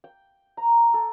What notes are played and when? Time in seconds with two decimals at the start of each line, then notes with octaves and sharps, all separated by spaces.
0.04 G5
0.57 A#5
0.94 A4